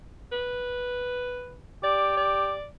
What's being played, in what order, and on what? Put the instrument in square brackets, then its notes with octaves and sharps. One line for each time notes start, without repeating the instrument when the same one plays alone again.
[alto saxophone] B4
[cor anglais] G4 [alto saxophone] D5
[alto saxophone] D5